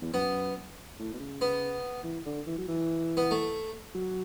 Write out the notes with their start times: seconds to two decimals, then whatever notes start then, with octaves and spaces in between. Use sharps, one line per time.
0.02 E2
0.13 F#2 B3
0.99 A2
1.13 B2
1.19 C#3
1.41 B3
2.04 E3
2.26 D3
2.47 E3
2.58 F#3
2.68 E3
3.17 B3
3.31 A3
3.95 F#3